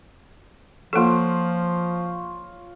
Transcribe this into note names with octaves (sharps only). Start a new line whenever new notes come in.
F3 A#3 F4 A4 C#5